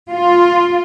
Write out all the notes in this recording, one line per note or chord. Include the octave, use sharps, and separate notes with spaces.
F4